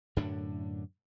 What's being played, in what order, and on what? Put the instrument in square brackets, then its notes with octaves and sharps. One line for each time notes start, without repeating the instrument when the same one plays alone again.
[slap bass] F#2 A2 D3 D4